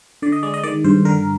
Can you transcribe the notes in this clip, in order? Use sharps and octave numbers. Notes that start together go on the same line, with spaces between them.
D3 D5
D#5
G#3 D5
D#5
D#3 D5
G2 C5
D3 A#4